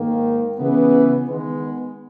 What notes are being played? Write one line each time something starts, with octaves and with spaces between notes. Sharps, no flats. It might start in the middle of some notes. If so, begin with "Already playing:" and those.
Already playing: G#2 D#3 A#3
C#3 E3 B3
D#3 G#3 B3